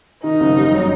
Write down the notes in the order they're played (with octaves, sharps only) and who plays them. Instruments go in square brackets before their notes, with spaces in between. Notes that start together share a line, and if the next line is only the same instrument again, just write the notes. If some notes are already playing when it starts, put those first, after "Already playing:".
[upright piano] D#3 [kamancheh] D#4
[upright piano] F#1
G3
F#3